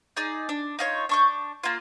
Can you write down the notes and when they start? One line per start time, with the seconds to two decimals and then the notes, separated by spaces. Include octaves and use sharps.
0.17 D#4 G#4 D5
0.49 D4
0.79 D#4 F4 C#5
1.09 D4 C#6 G6
1.63 A#3 F4